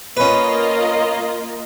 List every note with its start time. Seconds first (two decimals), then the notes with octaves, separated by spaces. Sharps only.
0.17 A#3 C#4 F4 B4 D#5